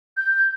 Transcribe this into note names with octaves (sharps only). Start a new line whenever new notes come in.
G6